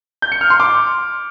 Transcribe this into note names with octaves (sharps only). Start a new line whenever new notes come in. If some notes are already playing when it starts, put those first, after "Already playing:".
G6
C#7
F6
C6
D6